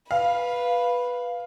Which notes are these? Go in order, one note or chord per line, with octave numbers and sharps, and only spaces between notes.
B4 F5